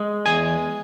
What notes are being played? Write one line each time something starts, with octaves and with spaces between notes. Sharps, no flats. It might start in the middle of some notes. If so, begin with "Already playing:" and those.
Already playing: G#3
E2 G#4 G#5